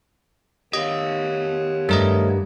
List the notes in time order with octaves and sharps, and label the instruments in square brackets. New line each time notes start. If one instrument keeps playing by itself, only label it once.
[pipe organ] D#3 B3 C#5 [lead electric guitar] G4 F5 [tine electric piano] D#5
[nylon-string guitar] G2 [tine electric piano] A3 A#4 D#5